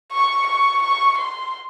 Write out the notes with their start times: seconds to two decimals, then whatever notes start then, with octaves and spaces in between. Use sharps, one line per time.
0.12 C#6
0.47 C#6
0.82 C#6
1.18 C6